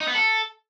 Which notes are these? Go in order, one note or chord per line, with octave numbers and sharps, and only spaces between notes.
D#4
B3
A4